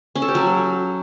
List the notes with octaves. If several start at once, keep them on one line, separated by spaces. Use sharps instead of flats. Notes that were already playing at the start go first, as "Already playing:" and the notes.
C#4
A4
G4
F#3